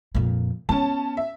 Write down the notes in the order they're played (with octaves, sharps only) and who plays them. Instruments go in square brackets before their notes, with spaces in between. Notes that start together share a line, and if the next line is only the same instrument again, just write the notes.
[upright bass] F2 A#2
[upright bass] B3 [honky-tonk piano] C#4 A5
[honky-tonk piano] E5